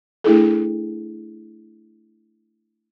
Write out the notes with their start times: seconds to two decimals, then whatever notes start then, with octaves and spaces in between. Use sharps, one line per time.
0.24 A3 D4 E4 G#4 A4